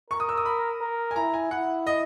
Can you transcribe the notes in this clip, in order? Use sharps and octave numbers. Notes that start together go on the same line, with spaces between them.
A#4 C#6
D#6
E6
D#6
B5
A#4
G#5
E4 A#5
G#5
E4 F#5
D#5